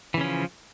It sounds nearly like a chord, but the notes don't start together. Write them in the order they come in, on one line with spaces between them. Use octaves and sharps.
E3 C#3 C#4 F3